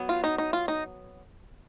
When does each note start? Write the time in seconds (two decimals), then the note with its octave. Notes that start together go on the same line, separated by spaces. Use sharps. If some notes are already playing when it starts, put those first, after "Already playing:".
Already playing: F#3 B3
0.09 F4
0.24 D#4
0.38 D#4
0.53 F4
0.68 D#4